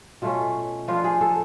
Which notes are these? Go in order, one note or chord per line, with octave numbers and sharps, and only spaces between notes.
B2 A3 C#4 F4
F3 B3 D4 F4
G#4
A4